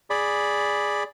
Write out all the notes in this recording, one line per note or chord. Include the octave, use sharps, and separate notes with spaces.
G#4 D5 B5